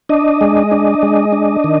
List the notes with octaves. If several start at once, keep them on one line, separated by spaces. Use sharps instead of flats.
D4 D#5
G#3
D4
G#3
D4
D#3